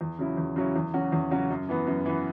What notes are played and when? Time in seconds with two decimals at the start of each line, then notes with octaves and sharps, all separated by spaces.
0.01 E2
0.19 C#3 F#3 C#4 E4
0.37 E2
0.56 C#3 F#3 C#4 E4
0.76 E2
0.94 C#3 F#3 C#4 F#4
1.12 E2
1.31 C#3 F#3 C#4 F#4
1.50 F#2
1.69 E3 B3
1.87 F#2
2.06 E3 B3